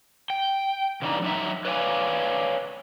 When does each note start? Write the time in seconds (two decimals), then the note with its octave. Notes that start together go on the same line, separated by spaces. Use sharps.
0.30 G5
1.02 C#3 E3 G3 D4 D#4
1.22 F#3 D#4 E5
1.65 B4 C#5 D5 F5 G#5